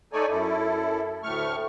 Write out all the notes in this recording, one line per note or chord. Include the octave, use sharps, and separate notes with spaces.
A3 D#4 A4 C#5 D5 G#5
F#2 E4 A4
D2 A2 A3 C#6 F6